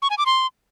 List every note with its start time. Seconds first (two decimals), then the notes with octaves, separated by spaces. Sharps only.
0.02 C#6
0.10 G#5
0.18 D6
0.26 C6